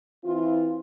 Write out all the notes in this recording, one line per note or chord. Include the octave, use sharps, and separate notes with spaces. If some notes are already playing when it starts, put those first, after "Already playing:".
E3 C4 E4 F4